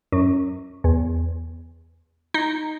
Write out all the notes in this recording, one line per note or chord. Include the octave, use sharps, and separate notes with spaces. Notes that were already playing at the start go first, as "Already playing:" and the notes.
F#2
E2
D#4